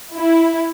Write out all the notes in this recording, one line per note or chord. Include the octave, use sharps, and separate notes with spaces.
E4